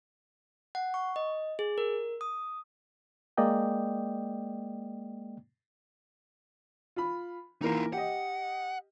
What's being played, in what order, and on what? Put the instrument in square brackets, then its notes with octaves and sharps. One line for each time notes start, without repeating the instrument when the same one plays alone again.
[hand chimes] F#5
C#6
D#5
G#4
A#4
D#6
[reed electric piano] G#3 A#3 D5 D#5 G5
[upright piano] F4 B5
[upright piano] E3 A#3 A#4 [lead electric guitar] D#4 F4
[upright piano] G4 D#5 [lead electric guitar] F#5